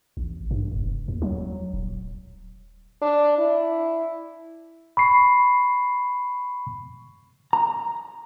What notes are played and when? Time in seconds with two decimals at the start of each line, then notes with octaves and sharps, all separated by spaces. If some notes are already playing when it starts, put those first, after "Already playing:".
0.17 A1
0.51 G2
0.72 F1
1.08 D#2
1.22 F#3
1.74 D#1
3.02 D4
3.38 E4
4.97 B5 C#6 C7
7.53 A#5